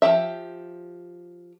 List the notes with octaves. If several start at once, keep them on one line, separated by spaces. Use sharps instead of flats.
F3 F#3 G4 E5